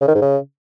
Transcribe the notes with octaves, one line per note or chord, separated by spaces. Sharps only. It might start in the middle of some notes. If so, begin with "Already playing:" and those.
C#3
D#3
G#2
C#3